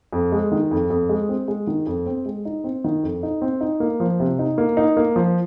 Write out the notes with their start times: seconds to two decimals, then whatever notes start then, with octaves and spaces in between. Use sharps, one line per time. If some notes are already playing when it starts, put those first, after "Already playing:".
0.13 F2
0.32 G#3
0.52 D#3
0.71 F2
0.90 F2
1.09 G#3
1.29 C4
1.48 G#3
1.67 D#3
1.87 F2
2.06 C4
2.26 G#3
2.45 D#4
2.64 C4
2.84 D#3
3.03 F2
3.23 D#4
3.42 C4
3.61 D#4
3.80 A#3
4.00 F3
4.20 C3
4.39 D#4
4.58 A#3
4.77 D#4
4.97 A#3
5.16 F3